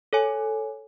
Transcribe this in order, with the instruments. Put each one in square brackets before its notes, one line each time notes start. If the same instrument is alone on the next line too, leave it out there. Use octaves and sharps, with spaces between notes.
[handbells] A4 C#5 G#5